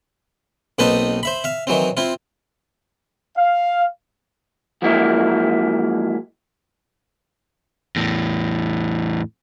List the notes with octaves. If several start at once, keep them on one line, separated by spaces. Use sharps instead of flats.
B1 A#3 C4 D#4 B4 A5
C5 E5 B5
E5 F5
D#3 E3 F#3 C4
C4 E4 F4
F5
F3 F#3 G#3 A#3 E4
E2 A2